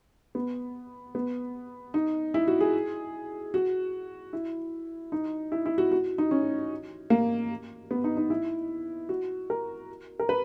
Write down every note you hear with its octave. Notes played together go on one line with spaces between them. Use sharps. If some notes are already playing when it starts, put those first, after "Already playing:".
B3
B3
D#4
E4
F#4
G#4
F#4
E4
D#4
E4
E4
F#4
F#4
D#4
C#4
A#3
B3
D#4
D#4
E4
F#4
A#4
A#4
B4